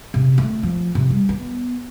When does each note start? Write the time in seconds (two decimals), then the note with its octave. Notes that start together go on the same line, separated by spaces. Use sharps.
0.14 C3
0.38 A3
0.63 F3
0.95 C3
1.10 G3
1.29 B3